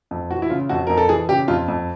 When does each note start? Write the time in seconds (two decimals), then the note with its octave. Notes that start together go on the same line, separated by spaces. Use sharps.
0.11 F2
0.31 E3 F#4
0.42 E4
0.50 C#3 F4
0.70 F2 F#4
0.87 F2 A#4
0.97 A4
1.09 E3 G#4
1.29 C#3 G4
1.48 F2 F4
1.68 F2